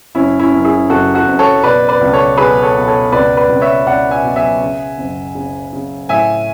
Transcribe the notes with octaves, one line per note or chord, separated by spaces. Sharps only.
F#1 C#4 E4
C#4 E4
F#2
E4 G#4
F#1 F#4 A4
F#4 A4
F#1
A4 C#5
B2 B4 D5
B4 D5
C#2
A4 C#5
B2 G#4 B4
A4 C#5
B2
A4 C#5
C#2 B4 D5
B4 D5
C#2
C#5 E5
C#2 D5 F#5
E5 G#5
B2
E5 G#5
C#3
F#1
C#3
C#3
A2 E5 G#5